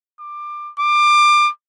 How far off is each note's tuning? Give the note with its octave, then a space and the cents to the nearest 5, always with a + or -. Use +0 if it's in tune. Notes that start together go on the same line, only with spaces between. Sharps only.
D6 +20
D6 +25